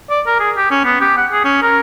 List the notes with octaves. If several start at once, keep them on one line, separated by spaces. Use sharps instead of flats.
D5
A#4
G#4
G4
C#4
B3
G4
F#5
G#4
C#4
A#4